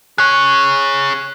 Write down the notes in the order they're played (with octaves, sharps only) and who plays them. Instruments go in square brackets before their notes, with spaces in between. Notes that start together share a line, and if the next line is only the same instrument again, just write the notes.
[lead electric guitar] G#4 C#5 [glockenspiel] F#6